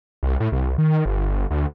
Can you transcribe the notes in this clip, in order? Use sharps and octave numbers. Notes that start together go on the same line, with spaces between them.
C2
A2
C2
D#3
G1
D2